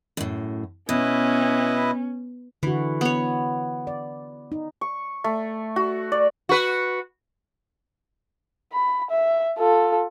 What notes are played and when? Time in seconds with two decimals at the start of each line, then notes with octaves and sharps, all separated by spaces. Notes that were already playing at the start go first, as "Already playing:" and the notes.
0.17 F#2 A2
0.89 B2 C#4 E4 B4 D#5
2.63 D3 E3 F#4
3.01 B3 C#5
3.87 D5
4.52 D#4
4.81 C#6
5.24 A3
5.76 F#4
6.12 D5
6.49 F#4 B4
8.73 B5
9.10 E5
9.58 F4 A4